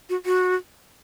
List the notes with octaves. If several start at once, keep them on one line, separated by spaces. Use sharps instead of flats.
F#4
F#4